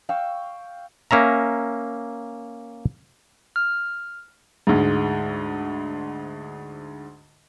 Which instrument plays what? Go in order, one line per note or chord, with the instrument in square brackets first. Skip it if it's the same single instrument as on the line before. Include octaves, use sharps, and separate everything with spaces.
[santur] F5 G5 C#6 E6
[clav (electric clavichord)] A#3 C#4 E5 A#5
[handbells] F6
[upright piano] D2 G#2